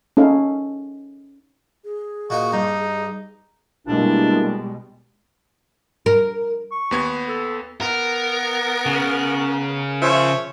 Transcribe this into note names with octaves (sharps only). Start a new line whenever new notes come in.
C#4 D#4 A4 F5
G#4
A#2 D#4 F#4
G2 D#4
B2 G3 G#3 A#3 D4 E4
A#4
C#6
D#2 B3 G#6
A4
B3 A#4
C#3
F3 C#5 E5